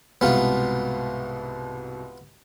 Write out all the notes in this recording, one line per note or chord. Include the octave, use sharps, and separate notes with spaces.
C2 G#2 B2 B3 F4